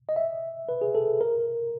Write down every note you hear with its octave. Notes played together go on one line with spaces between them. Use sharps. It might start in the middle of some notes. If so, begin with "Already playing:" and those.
D#5
E5
B4
G#4
A4
A#4